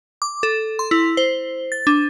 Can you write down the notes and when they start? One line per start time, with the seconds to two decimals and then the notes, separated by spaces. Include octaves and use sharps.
0.22 D6
0.43 A4
0.79 C6
0.91 E4
1.17 C5
1.72 A6
1.87 D4